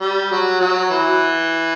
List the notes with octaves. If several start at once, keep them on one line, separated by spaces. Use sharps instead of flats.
G3
F#3
F#3
E3